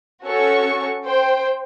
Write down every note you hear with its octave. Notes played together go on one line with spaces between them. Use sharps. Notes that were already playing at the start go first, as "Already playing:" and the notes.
C#4 F#4 A4 C#5 C#6
C5 G5